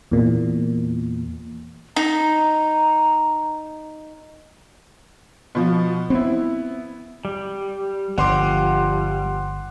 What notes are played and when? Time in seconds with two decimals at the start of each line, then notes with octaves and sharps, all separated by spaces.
0.11 E2 A#2
1.96 D#4 A#5
5.55 B2 F3
6.10 B3 C4 E4
7.25 G3
8.18 G1 F3 G3 F#5 C6 D6